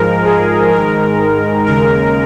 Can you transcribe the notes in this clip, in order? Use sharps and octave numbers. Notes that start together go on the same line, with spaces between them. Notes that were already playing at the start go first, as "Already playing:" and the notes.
Already playing: G#2 F3 G#3 A#4
G#4
G#2 D#3 G#3 A#4
D#2 C#3 G#3 A#4